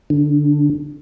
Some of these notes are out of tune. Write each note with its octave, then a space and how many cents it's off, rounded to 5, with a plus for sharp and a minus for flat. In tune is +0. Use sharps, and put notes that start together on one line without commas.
D3 +0